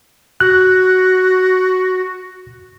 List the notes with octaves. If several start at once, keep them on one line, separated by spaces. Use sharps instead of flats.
F#4 F#6